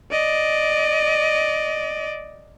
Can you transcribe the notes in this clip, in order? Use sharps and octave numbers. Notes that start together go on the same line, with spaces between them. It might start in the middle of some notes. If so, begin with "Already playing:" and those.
D5 D#5